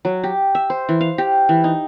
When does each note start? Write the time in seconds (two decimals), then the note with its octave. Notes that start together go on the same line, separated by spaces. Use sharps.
0.05 F#3
0.23 G4
0.55 E5
0.70 C5
0.89 E3
1.01 F5
1.18 G4
1.49 E3
1.64 D#4